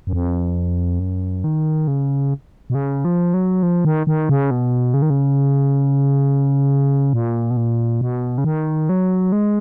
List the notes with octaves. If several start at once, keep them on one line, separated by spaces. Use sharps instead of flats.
F#2
F2
F#2
D#3
C#3
B2
C#3
F3
F#3
F3
D#3
D#3
C#3
B2
C#3
D#3
C#3
A#2
B2
A#2
B2
C#3
D#3
F#3
G#3